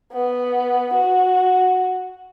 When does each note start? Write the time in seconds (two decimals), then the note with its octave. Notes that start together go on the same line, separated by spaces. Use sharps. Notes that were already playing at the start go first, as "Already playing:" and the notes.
0.12 B3
0.93 F#4